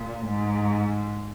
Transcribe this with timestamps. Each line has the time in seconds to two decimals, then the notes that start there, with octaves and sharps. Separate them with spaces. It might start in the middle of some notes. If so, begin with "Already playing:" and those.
Already playing: A#2
0.25 G#2